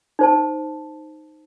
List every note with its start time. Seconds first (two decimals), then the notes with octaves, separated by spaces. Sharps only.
0.19 D#4 C5 A5